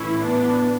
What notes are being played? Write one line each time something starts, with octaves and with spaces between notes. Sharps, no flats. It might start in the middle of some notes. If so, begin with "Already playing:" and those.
Already playing: A2 E3 C#4 E4
B3 D4